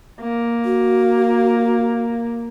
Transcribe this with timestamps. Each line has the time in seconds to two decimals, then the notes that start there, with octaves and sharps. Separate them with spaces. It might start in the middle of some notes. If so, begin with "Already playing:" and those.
0.21 A#3
0.65 F#4